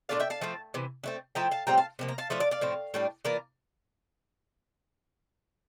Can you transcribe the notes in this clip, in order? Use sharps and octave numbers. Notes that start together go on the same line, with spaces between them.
A#2 A3 D4 F4 D5 F5
E5 G5
F5 A5
F3 A3 C4 F4
C3 E3
D3 A3 C4
F3 A3 E4 G5 A#5
F5 A5
A2 G3 C4 F4 G5 A#5
F5 A5
C3 F3 A#3
A#5
F5 A5
F3 A3 D4 F4 E5
D5 F5
D5 F5
A2 F3 C4
A2 G3 D4
E3 A#3 F4 A#4 D5